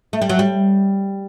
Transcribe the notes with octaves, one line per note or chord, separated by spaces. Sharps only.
A3
G3
F#3
G3